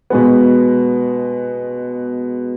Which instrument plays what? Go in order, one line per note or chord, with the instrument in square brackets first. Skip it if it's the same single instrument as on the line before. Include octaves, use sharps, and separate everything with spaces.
[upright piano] B2 G#3 B3